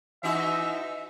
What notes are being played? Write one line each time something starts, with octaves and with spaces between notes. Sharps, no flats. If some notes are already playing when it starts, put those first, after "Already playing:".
E3 D#4 F#4 E5